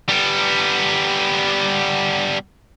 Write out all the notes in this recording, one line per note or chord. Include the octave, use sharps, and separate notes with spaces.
G3 B3